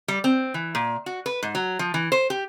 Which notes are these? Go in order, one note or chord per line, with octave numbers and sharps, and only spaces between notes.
G3
C4
E3
A#2
F#4
B4
G#2
F#3
F3
E3
C5
G4